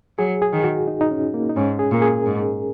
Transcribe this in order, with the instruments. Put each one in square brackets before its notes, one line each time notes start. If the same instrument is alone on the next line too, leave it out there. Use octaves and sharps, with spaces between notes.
[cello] F#3 [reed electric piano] G#4
[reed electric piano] G#4
[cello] D#3
[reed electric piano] F#4
D#4
D#4
C#4
A#3
D#4
[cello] G#2 [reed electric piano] C#4
[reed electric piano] G#4
[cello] A#2 [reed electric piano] A#4
[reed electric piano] G#4
[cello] G#2